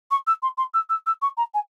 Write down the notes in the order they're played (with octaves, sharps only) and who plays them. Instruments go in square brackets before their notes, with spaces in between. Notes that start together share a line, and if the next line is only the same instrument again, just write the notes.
[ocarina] C#6
E6
C6
C6
E6
E6
E6
C#6
A#5
G#5